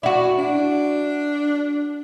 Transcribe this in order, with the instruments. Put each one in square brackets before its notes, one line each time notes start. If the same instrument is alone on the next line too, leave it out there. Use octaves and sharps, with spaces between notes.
[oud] E4 F#4 [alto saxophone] D5
[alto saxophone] D4